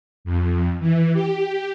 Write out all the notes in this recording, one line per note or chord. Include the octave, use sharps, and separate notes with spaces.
F2
E3
G4